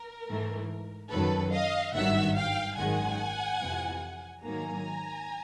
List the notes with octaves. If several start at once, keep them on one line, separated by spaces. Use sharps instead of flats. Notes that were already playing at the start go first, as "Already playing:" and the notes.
Already playing: A#4
G#2 E3 A3
F#2 D#3 F#3 A4 B4
D#5 F5
G#1 G2 D#3 F#3 E5 F#5
F5 G5
G#1 F#2 D#3 G#3 F#5 G#5
F2 C3 E3
G#2 D#3 F#3 A#3 G#5 A#5